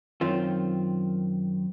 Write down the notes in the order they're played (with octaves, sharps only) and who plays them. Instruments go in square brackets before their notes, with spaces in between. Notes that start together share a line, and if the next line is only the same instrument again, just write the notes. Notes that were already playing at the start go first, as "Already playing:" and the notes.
[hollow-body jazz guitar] F#2 D#3 C4 F4